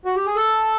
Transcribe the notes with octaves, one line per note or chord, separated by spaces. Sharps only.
F#4
G4
G#4
A4